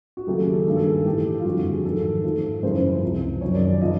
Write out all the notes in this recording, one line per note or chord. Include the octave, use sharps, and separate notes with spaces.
F#4
D#2 C#3 F#3 A3 G4
G#4
A4
G2 D#3 G#3 G#4
A4
G#4
A2 E3 A3 G4
F4
F2 D3 G3 F#4
F#4
G#4
G#2 D#3 F#3 A4
G#2 F3 A3
F#2 C#3 E3 G#3 C5
C#2 C3 F3
F#2 D#3 F#3 C#5
D5
D5
C#3 F3 D#5